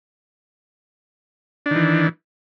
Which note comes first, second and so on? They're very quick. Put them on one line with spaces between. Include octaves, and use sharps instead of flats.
D4 D#3 E3